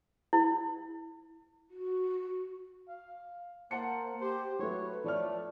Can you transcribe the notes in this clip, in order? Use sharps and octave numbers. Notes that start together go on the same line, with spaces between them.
E4
F#4
F5
A#3 C5 F#5 A5 C#7
G4 C5
F#3 A3 B4 C#5
F3 A3 C#5 D5 F6